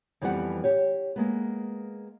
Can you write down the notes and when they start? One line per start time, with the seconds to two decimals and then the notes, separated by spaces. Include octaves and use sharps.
0.21 F2 E3 F3 G3 B3 F#5
0.64 G4 C#5
1.16 G#3 A#3 B3